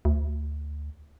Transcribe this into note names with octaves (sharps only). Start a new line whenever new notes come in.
D2